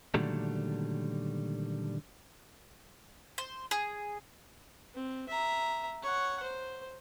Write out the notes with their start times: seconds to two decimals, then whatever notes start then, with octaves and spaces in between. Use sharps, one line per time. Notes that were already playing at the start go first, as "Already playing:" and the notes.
0.14 A#2 D3 D#3 F#3 G3 A3
3.38 C5
3.71 G#4
4.95 C4
5.29 E5 A#5
6.03 C#5 F#5
6.43 C5